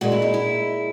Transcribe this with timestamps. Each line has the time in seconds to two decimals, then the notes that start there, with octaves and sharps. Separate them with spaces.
0.01 A#2 G#3 F#4
0.12 E4
0.22 D#4
0.34 E4